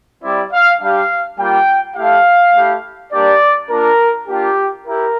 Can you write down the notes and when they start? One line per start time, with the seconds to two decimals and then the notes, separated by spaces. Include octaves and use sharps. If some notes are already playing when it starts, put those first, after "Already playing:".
0.23 G3 C4 E4 D5
0.52 F5
0.81 G3 D4 G4 F5
1.38 G3 A#3 F4 G5
1.96 A3 E4 G4 F5
2.55 A3 E4 G4
3.12 G3 A#3 D4 G4 D5
3.70 A#3 D4 F4 A#4
4.28 A#3 D4 F4 G4
4.87 E4 G4 A#4